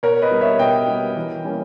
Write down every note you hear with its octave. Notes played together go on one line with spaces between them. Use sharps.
B2 A#4 C#5
B4 D#5
G3 B3
C#5 E5
B2 D#5 G5
G3 B3
E3
G3 A#3 C#4